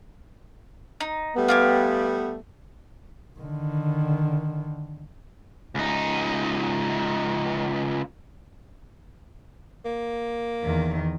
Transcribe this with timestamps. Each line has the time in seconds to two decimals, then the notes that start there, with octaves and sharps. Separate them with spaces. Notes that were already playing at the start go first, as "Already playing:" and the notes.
1.00 D#4
1.36 G3 A3 B3
1.48 F4 G4 G#5
3.39 D3 D#3
5.75 C#2 D#4
9.85 A#3
10.64 E2 D#3